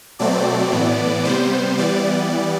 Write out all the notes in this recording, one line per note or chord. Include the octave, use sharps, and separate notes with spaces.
B2 F#3 A3 C4 D5
A2 E3 B3
C3 G3 B3 C5
E3 G3 B3 D5